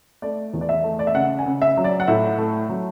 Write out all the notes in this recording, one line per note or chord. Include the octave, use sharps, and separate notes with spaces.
A3 D5
E2
D5
E5
A3
D5
E5
C#3 F#5
G#5
C#3
E5
F#3
D5
F#5
A2 E5
A3
F#3